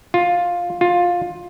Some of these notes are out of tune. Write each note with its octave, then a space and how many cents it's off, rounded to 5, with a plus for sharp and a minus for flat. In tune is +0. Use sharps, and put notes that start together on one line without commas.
F4 +10
F4 +15